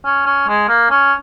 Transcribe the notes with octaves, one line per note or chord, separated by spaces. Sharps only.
C#4
C#4
G#3
A#3
C#4